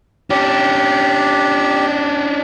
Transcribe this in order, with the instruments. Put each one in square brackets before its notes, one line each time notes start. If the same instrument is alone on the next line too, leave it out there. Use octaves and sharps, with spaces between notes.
[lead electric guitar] C#4 D4 [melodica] G4